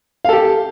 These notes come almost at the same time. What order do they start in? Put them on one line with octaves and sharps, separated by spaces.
F5 A4 G4